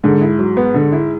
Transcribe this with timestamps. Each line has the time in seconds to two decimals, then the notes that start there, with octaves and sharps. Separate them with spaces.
0.04 G#2 D3
0.21 E4
0.39 F#3
0.57 B3
0.74 D3
0.92 E4